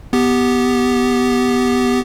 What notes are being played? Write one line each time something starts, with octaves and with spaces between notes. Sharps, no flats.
B3 G4